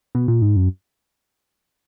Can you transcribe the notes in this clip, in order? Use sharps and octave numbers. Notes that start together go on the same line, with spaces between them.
B2
A#2
G#2
F#2